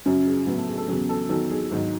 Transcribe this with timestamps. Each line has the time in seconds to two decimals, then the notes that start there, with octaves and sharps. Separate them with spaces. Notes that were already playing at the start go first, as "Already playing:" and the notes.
0.06 F#2 C#3 F#3 C#4
0.26 G#4
0.46 A2 F#3 B3
0.57 A3
0.68 G#4
0.77 A4
0.88 E2 C#3 F#3 G#4
1.09 A4
1.29 E2 D#3 F#3 A4
1.50 G#4
1.71 G#2 D#3 F#3